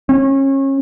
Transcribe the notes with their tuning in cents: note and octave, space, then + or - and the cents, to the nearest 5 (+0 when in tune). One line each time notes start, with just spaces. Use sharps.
C#4 -30